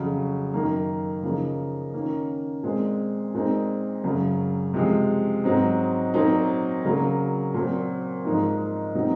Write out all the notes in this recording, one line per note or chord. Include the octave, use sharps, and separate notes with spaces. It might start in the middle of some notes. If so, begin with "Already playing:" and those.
Already playing: F2 C#3 F#3
F#2 D#3 A#3
C#3 F3 A#3 D#4
D#3 A#3 C#4
A#2 G#3 C4
A#2 G#3 C4 D#4
F#2 C#3 F#3
C3 F3 G#3
G#2 F#3 C4 D#4
A#2 F#3 C4 D#4
C#3 F#3 A#3
A#2 F#3 C4
G#2 F3 A#3 D#4
C3 F#3 C4 D#4